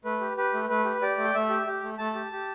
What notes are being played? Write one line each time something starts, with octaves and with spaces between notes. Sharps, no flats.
A3 B4
G4
G4 B4
A3
A3 B4
G4
G4 D5
A3
G5
A3 E5
G4
G4
A3
A3 A5
G4
G4